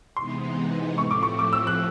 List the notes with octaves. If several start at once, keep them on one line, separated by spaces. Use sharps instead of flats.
C3 E3 G#3 B3 D#4 C6
A2 F3 A3 C4 C#6
D6
C#6
D6
E6
F#6